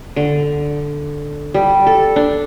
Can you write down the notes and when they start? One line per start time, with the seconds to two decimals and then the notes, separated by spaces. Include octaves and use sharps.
0.16 D3
1.54 G3
1.87 A4
2.16 D4